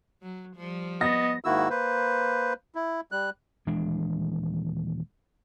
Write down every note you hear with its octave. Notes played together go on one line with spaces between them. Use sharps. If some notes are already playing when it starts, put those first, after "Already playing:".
F#3
F3 G3
B3 D#5 A6 A#6
G#2 D#3 A#3 E4 F#4 E6
A#3 B4 C5
E4
G3 F#6
D#1 E3 G#3 D4